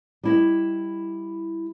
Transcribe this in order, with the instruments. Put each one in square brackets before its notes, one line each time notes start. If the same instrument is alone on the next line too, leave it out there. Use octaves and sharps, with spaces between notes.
[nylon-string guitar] G3 E4 D#5